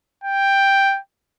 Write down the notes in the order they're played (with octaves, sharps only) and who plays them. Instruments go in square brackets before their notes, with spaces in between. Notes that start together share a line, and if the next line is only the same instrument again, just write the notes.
[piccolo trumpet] G5